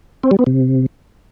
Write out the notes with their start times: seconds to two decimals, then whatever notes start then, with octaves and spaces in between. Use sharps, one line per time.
0.24 C4
0.31 G3
0.39 B3
0.47 C3